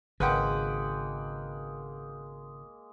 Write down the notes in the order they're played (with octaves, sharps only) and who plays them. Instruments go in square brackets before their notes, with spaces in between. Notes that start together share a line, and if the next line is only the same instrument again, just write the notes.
[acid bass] G#1 [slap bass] C#3 [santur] G#3 A#3 [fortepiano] B4 F#5 G5